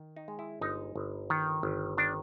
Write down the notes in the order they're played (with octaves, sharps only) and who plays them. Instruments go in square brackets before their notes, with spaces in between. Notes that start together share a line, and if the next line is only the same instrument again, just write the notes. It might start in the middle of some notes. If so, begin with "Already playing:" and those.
Already playing: [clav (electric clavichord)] D#3
D#4
G#3
E4
G1 D#4
G1
D#3
G1
D#3 D4